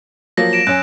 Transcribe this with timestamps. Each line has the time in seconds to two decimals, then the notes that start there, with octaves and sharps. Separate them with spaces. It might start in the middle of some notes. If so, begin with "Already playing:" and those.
0.37 F3 F#3 A#3 A#6
0.53 A#6 D7 E7
0.67 F#2 C#4 F#6